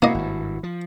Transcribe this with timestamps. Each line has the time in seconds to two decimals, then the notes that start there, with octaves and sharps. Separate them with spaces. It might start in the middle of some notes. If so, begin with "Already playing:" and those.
0.02 C3 A#3 E4 F#4 D#5
0.15 G#1 G2
0.63 F3